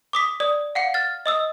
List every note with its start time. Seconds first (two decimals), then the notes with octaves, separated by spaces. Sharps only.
0.13 D6 D#6 B6
0.40 D5 D#6
0.75 F5 F#5 C#7
0.94 F6 A6
1.26 D#5 D#6 E6